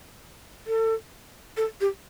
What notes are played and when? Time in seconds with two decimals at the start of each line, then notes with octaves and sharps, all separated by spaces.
0.67 A4
1.57 A4
1.81 G4